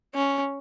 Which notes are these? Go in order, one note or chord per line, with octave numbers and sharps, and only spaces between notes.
C#4